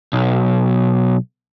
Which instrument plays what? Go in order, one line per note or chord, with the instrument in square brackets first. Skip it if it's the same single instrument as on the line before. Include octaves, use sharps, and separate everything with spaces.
[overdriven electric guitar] B1